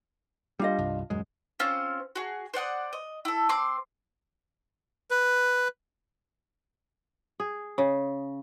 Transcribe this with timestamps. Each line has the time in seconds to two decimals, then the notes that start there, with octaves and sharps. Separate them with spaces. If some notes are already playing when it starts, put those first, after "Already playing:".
0.60 G3 D4 F4 D#5
0.79 C2 G2
1.10 D#1 F#2 G#3
1.59 C4 C#4 F4 C5
2.16 F#4 G#4
2.54 C5 D5 F#5 D#6
2.93 D#5
3.25 E4 A4
3.49 C4 C6 D6
5.11 B4
7.40 G#4
7.78 C#3